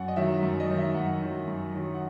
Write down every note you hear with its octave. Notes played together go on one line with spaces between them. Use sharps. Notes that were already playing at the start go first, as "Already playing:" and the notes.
Already playing: F#2 F#5
D#5
D#3 F#3 E5
F#2
D#5
D#3 F#3
E5
F#2 F#5
D#3 F#3
F#2
D#3 F#3
F#5